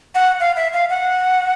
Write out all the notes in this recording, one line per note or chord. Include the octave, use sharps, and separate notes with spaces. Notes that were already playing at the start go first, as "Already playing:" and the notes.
F#5
F5
E5
F5
F#5